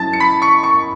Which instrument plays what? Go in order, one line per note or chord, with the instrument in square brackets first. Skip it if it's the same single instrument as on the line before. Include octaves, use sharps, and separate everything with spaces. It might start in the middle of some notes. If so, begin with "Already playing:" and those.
Already playing: [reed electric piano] F#3 C#4 E4 [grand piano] A5 A6
[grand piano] C#7
B5 B6
C#6 C#7
C#6 C#7